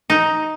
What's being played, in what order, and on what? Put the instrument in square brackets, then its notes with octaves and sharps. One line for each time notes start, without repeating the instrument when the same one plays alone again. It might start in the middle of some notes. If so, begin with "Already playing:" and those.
[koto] D#4